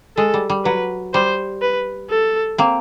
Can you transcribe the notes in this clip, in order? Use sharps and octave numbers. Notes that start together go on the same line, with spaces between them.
G#3 A4
G3
G3
F#3 B4
G3 C5
B4
A4
A#3 C4